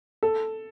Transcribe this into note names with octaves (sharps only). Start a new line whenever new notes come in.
A4